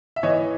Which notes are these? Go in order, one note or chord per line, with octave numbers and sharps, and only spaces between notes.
E5
E3 C#5 D#5